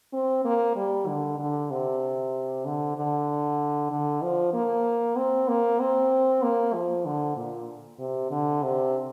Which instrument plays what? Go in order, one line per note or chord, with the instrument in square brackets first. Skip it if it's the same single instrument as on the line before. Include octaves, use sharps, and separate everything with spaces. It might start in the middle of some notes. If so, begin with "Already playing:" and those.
[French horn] C4
A#3
G3
D3
D3
C3
D3
D3
D3
F3
A#3
C4
A#3
C4
A#3
F3
D3
A#2
C3
D3
C3